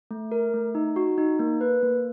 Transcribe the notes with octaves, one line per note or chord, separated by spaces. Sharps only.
A3
A#4
A3
D#4
F#4
D#4
A#3
B4
A#3